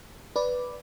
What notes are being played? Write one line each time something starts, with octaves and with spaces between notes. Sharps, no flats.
B4 D5